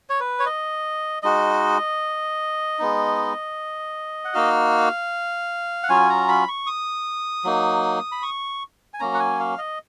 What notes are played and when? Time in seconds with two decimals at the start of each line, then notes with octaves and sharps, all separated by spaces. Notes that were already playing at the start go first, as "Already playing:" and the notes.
0.10 C#5
0.20 B4
0.40 C#5
0.46 D#5
1.23 G#3 D#4 F#4 D#5
2.79 G#3 B3 D#4
4.25 F#5
4.34 A#3 D#4 F#4 F5
5.83 F#5
5.89 F#3 C#4 F4 G#5
6.10 A#5
6.28 B5
6.48 C#6
6.67 D#6
7.45 F#3 A#3 D#4
8.12 B5
8.22 C#6
8.94 G#5
9.00 F#3 A#3 C#4 A#5
9.14 F#5
9.20 G#5
9.40 F5
9.58 D#5